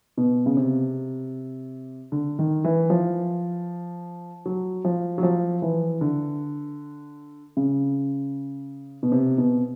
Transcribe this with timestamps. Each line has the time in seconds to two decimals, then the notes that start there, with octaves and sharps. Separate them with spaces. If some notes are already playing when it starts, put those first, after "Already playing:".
0.17 B2
0.46 C#3
0.57 C3
2.12 D3
2.39 D#3
2.64 E3
2.90 F3
4.46 F#3
4.85 F3
5.18 F#3
5.23 F3
5.62 E3
6.01 D3
7.57 C#3
9.03 B2
9.12 C3
9.38 B2